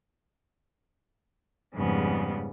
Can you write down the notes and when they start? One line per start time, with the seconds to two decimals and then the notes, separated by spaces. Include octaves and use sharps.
1.75 F2 G#2 C#3 G3 G#3 B3